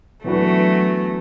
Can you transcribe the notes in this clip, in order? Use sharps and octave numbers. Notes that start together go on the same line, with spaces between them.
E3 F#3 A3 B3 D4 F#4 B4